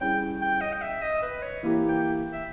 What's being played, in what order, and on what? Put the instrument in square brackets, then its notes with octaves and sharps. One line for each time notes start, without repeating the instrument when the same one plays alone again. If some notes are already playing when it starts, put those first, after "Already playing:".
[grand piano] G3 C#4 E4 G#4 [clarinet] G5
[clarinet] G5
D#5
G5
E5
D#5
B4
C#5
[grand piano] E3 A#3 E4 G4
[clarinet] G5
E5